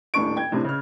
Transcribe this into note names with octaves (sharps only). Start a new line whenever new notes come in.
D#1 A2 D4 C#6 D7
G5 G#6
A2 C3 D4
C#3 F6